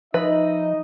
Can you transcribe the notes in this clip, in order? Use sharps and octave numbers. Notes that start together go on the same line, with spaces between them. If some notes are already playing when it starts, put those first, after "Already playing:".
F3 D#4 B4 D#5 E5